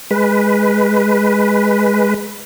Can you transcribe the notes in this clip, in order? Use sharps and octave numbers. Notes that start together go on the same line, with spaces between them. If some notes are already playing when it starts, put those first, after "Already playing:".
G#3 B4